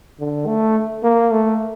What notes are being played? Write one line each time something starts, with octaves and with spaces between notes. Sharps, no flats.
D3
A3
A#3
A3